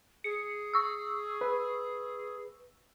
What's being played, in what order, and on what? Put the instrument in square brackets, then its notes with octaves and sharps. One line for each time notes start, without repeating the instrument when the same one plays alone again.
[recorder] G#4 [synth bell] C#7
[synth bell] C#6 E6
[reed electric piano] B4